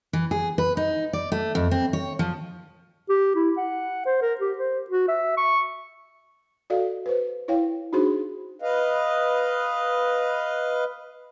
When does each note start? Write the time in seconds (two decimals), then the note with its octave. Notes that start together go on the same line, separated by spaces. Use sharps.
0.13 E3
0.31 G#4
0.58 B4
0.77 D#4
1.13 D5
1.32 A3
1.55 F2
1.71 C4
1.93 C#5
2.19 F3
3.09 G4
3.35 E4
3.57 F#5
4.06 C5
4.21 A#4
4.41 G4
4.58 C5
4.90 F#4
5.08 E5
5.37 C#6
6.70 F#4 A4 D5 D#5 F5
7.06 B4 C5
7.48 E4 C#5 F5 G5
7.93 D4 D#4 F#4 G#4 C5 C6
8.62 B4 D#5 F5